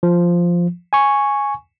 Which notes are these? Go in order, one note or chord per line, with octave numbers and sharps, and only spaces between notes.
F3
G#5 C#6